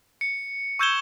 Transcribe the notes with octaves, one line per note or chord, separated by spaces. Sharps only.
C#7
C#6 E6 G6 G#6 E7 G7